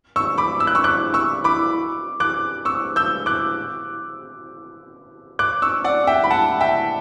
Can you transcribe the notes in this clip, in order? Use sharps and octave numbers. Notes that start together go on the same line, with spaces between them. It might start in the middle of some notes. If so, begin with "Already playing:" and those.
C#6 E6
B5 D6
E6
F#6
C#6 E6
D6 F#6
C#6 E6
B5 D6
D6 F#6
C#6 E6
E6 G6
D6 F#6
D6 F#6
C#6 E6
D5 F#5
E5 G5
B5
F#5 A5
E5 G5